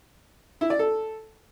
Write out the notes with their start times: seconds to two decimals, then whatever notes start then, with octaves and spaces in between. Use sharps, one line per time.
0.61 E4
0.70 D5
0.79 A4